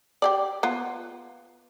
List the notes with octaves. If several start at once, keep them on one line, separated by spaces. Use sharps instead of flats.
G4 G#4 D5
B3 F4